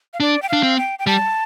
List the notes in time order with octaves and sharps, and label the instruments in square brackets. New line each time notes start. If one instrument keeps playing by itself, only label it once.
[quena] F5
[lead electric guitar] D4 [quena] D5
[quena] G5
[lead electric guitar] D4 [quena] F5
[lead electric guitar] C4
[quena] G5
G5
[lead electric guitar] G3 [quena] A5